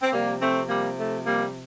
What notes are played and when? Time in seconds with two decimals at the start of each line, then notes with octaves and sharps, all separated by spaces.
0.01 C4
0.13 C3 F3 G3 A#3
0.41 A3 C4
0.69 G3 A#3
0.97 A3
1.24 G3 A#3